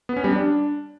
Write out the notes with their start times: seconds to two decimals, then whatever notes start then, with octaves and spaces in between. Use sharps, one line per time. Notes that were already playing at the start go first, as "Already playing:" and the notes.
0.09 B3
0.17 C#4
0.24 G3
0.32 D4